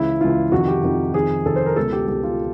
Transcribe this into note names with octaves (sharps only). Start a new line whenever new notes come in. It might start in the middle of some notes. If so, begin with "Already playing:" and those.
Already playing: C#2 C#3 E3 E4
C#2 C#3 E3 F4
F2 C3 D#3 F#4
G4
F2 C3 D#3
F2 C3 D#3 G#4
F2 C3 D#3 A4
C5
A#4
C#2 B2 A4
G4
C#2 B2 G4
F4